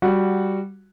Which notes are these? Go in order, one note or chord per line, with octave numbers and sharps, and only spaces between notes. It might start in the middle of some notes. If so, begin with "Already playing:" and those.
G3 F#4 F#5